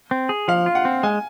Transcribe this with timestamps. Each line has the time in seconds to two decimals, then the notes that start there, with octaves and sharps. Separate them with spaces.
0.11 C4
0.29 G#4
0.48 F3 F5
0.66 F4
0.75 F#5
0.85 C4
1.03 G#3 G#5